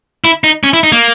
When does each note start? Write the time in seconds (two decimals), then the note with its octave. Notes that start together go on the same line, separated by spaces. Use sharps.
0.24 E4
0.44 D#4
0.64 C#4
0.73 E4
0.83 D#4
0.92 A#3